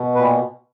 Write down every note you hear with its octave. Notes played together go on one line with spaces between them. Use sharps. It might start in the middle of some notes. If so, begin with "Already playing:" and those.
Already playing: B2
A#2 B4